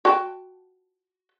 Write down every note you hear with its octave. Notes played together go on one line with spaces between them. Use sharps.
F#4 G5 A5